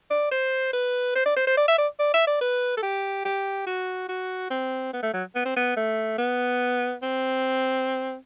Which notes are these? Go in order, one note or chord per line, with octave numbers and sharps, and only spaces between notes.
D5
C5
B4
C5
D5
C5
C5
D5
E5
D5
D5
E5
D5
B4
A4
G4
G4
F#4
F#4
C4
B3
A3
F#3
B3
C4
B3
A3
B3
C4